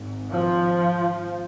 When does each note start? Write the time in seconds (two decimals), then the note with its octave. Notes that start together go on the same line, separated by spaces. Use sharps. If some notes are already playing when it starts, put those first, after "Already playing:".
Already playing: G#1 G#2
0.29 F3